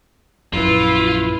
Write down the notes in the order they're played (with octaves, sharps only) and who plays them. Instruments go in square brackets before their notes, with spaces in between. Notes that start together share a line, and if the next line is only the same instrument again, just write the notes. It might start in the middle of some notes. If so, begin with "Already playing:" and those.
[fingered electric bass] A#1 F#2 [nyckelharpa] E4 B4 [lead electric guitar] F4